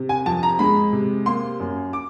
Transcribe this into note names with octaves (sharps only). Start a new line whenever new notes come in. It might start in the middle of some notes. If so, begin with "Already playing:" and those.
Already playing: C3
G#5
F2 A5
A#5
G#3 B5
C3
A#3 C6
F#2
D6